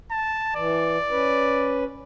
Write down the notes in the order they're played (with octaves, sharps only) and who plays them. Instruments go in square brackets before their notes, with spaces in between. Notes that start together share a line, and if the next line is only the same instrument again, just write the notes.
[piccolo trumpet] A5
[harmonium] E3 [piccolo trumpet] D5
[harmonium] C#4 B4